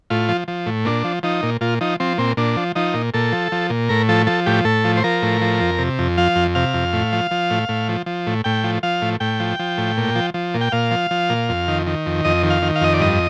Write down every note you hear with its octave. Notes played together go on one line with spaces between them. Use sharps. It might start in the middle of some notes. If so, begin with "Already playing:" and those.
A2 F4
F3
F3
A2
A#2 D4
F3
F3 D#4
A#2
A#2 F4
F3 D#4
F3 C4
A#2 C4
A#2 D4
F3
F3 D#4
A#2
A#2 A4
F3
F3
A#2
A2 A#4
F3 A4
F3 A4
A2 G4
A2 A4
F3
C5
F3 A#4
A2
F3
F2
C3
F2
F3 F5
F2
C3 F5
F2
A2
F3
F3
A2
A2
F3
F3
A2
A2 G5
F3
F3 F5
A2
A2 G5
F3
F3
A2
A#2
F3
F3
A#2
G5
A#2 F5
F3
F3
A#2
F2
D#3
D#3
F2
F2 D#5
D#3
F5
D#3
F5
F2 D#5
D5
G2 D#5